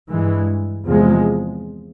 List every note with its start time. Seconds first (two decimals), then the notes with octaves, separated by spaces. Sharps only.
0.09 G2 E3 G#3
0.84 E2 C3 F3 G#3